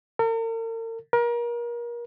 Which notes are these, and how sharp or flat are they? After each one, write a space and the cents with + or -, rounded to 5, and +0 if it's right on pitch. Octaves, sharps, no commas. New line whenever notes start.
A#4 -45
A#4 +30